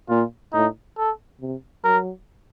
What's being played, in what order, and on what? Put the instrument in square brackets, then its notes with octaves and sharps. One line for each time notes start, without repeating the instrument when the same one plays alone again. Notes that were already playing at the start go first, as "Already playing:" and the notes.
[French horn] A#2 [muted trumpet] F4
[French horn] A2 [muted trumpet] D#4
[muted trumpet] A4
[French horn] C3
[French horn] F#3 [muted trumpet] A#4